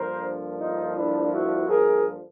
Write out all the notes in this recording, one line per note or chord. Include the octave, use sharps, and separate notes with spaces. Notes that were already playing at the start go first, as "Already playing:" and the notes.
Already playing: G2 D3 F3 A#3 A#4 C5
D#4 F4
D4 E4
E4 F#4
G#4 A#4